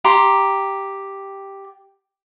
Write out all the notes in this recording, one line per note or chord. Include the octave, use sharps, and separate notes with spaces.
G4 A#5 C6